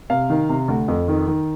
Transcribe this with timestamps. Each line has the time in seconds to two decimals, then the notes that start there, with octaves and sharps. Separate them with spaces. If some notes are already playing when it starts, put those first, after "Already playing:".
0.10 C3 F5
0.30 D#3
0.49 C3
0.68 D2
0.88 F2
1.08 D#3
1.27 D#3